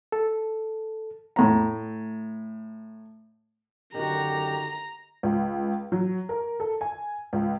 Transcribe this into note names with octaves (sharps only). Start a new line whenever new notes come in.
A4
A2 A#5
F#2 D3 D#3 F#4 G4 A#5
C#2
F#3
A#4
A4
G#5
C#2